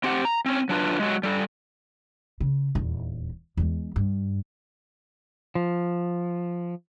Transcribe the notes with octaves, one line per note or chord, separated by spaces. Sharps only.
C4 G4 F#5
A#5
C4 C#4
F#3 D4 F4 B4
F#3 G#3
G3 A4
C#3
D#1 E2
E2 G#3
G2
F3